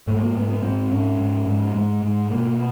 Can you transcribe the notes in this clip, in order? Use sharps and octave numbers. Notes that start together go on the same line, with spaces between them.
G#2 A3
A#3
G#2 B3
B3
G#2 C4
G#2 C#4
G#2
G#2
G#2 G#3
G#2
B2 A#3